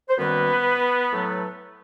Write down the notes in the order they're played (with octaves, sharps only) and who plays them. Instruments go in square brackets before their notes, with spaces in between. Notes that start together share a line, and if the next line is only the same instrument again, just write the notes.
[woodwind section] C5
F#2 D#3 G3 A#3 B3 B4
A2 F#3 A3